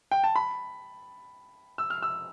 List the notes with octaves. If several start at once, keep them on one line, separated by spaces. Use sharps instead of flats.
G5
A5
B5
E6
F6
E6